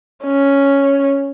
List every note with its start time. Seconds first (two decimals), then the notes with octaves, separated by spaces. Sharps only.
0.25 C#4